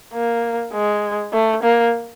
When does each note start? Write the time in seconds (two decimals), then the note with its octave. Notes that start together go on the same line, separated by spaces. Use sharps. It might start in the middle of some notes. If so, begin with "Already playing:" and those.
0.14 A#3
0.73 G#3
1.33 A3
1.63 A#3